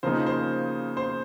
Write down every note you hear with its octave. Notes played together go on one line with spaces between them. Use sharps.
C#3 F3 A#3 D#4 C5
C5
C5